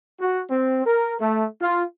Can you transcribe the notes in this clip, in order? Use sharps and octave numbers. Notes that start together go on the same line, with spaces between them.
F#4
C4
A#4
A3
F4